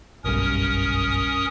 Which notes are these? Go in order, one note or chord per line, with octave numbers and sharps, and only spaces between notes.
F#1 B1 G2 C#4 A#4 D#6